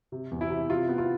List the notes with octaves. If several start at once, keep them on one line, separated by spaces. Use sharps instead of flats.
C3
E2
E4
C3
C3 F4
B3
F4